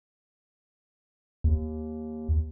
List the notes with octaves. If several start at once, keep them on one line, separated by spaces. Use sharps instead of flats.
D#2